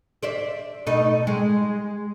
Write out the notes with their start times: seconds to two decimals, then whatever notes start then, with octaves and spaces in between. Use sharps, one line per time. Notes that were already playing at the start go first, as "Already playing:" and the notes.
0.23 C5 D5 E5
0.86 B2 A3 D#4
1.27 G#3